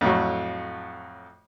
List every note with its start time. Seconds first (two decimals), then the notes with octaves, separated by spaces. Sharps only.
0.01 F2 A2 F#3